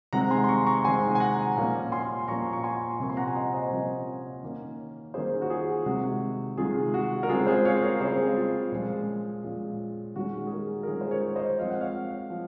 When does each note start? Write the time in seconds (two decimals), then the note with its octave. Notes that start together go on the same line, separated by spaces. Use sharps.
0.13 C3 D#3 G#3 C4 F#5 A#5
0.31 G#5 C6
0.44 C6
0.49 A#5 C#6
0.66 A#5 C#6
0.84 C3 D#3 G#3 C4 G#5 C6
1.15 G#5
1.20 F#5 A#5
1.56 A#2 F3 A#3 C#4
1.92 G#5 C6
2.28 A#2 F3 A#3 C#4 A#5 C#6
2.53 C#6
2.63 G#5 C6
3.00 C3 F3 A#3 C#4 C#6
3.09 C6
3.17 F#5 A#5
3.28 G#5
3.35 D#5 F#5
3.53 C5 D#5
3.71 C3 F3 A#3 C#4
4.43 D#3 A#3 C#4
5.14 D#3 A#3 C#4 G#4 C5
5.41 F#4
5.50 F4 G#4
5.86 C3 D#3 G#3 F#4
6.58 C3 D#3 G#3 F4 G#4
6.94 F#4
7.23 A#4
7.29 C#3 G#3 C4 F4 G#4
7.47 G#4 C5
7.65 C#5 F5
7.82 A#4 C#5
8.01 C#3 G#3 C4 G#4 C5
8.36 F4
8.72 A#2 F3 G#3 C#4
9.44 A#2 F3 G#3 C#4
10.15 D#3 G#3 C#4 F#4
10.47 G#4
10.52 F#4 A#4
10.83 A#4
10.87 D#3 G#3 C#4 F4 G#4
11.01 C5
11.11 A#4 C#5
11.36 C5 D#5
11.59 F3 G#3 C4 F5
11.70 F#5
11.81 C#5 F5
12.30 F3